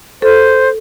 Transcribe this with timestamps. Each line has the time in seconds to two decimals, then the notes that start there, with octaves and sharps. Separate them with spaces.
0.22 A4 C5